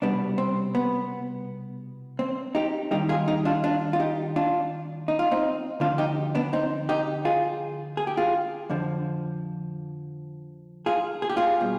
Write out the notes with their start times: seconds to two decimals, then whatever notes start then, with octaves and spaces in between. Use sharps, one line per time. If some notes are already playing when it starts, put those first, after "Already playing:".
0.02 C2 B2 G3 B3 D4
0.38 C4
0.75 B3
2.19 C4
2.55 D#4 G4
2.91 D#2 D#3 G3 D#4 G4
3.09 F4 G#4
3.28 D#4 G4
3.45 D4 F4
3.64 D4 F4
3.93 F4
3.99 D#4 G4
4.36 D4 F4
5.08 D#4
5.19 F4
5.31 C4 D#4
5.80 D2 D3 F3 D4 F4
5.98 D#4 G4
6.35 B3 D4
6.53 C4 D#4
6.89 D#4 G4
7.25 F4 G#4
7.97 G#4
8.07 G4
8.17 F4 G#4
8.70 F2 D3 F3
10.86 F4 G#4
11.22 G#4
11.30 G4
11.37 F4 G#4
11.61 B2 G3